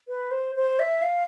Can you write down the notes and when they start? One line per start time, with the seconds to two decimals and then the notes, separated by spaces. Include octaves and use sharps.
0.08 B4
0.31 C5
0.56 C5
0.79 E5
1.02 F5